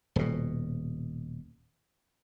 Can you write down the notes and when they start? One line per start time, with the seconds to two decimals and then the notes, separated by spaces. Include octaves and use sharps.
0.16 D#1 B2